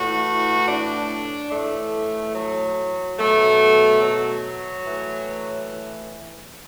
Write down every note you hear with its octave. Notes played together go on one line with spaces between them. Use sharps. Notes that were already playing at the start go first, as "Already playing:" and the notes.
Already playing: A2 E3 F#4
D4
A2 E3 A3
F#3
B2 F#3 A3
F#3
A2 E3